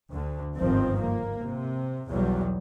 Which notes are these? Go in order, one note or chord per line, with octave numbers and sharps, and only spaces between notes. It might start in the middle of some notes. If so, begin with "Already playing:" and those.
D2 D3
G1 G#2 D#3 F3 C4
A#3
C3
B1 E2 F#3 G3